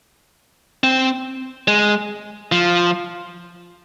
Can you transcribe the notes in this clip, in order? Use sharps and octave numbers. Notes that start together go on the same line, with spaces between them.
C4
G#3
F3